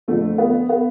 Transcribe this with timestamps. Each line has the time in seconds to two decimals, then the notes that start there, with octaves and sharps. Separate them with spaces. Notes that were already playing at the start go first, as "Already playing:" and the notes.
0.08 F2 D3 F3 A3
0.38 B3
0.69 B3